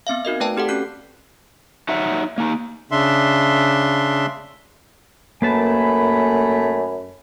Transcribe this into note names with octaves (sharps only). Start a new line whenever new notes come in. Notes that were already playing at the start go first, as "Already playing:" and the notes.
B3 C4 E5 F5
D#4 F#4 A#4 D#5
A3 B4 D5 G5 A5
C4 G4 A4 F#5
C#4 F#4 F#6 C7
F#3 D#4 E5 F#5
A#3 D#4
C#3 D4 E5 C6
F#2 A3 A#3 B4 G#5 A5 B5